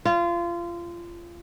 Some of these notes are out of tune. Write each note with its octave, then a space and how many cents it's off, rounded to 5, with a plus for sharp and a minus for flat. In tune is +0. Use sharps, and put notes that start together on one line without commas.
F4 -25